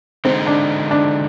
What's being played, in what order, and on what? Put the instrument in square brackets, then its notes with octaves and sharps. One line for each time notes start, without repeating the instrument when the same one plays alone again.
[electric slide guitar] D3 G#3 D#4 [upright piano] C4
[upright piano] D4
D4